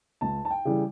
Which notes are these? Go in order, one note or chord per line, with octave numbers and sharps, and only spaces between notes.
C#2 A5
A5
G5
C#3 E3 G3